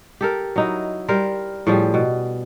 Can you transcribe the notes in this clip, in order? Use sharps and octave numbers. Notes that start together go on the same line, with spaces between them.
G4 A4 A#4
F#3 D#4 E4
G3 A#4 C5
A2 F3 G3 G#4
B2